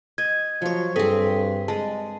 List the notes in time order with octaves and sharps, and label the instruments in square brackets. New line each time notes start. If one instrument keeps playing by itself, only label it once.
[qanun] D#5 [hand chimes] G#6
[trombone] F3 [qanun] F#3 C#5
[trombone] G2 [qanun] C4 G#4 [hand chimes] A4 B6
[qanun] G#3 [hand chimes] A5